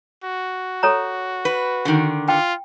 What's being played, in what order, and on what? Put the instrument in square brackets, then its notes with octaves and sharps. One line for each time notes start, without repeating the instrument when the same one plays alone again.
[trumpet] F#4
[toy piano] A4 C#5 A#5
[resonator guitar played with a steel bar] B4
D3 D#3
[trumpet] F4 [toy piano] G5